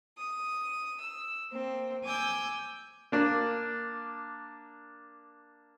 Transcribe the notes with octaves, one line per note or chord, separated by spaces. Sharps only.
D#6
E6
A#3 C4
G#5 D6 E6 G6
A#3 D4